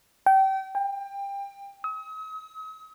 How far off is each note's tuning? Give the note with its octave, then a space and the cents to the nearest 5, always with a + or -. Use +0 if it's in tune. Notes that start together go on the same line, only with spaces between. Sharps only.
G5 -30
G5 +25
D#6 +45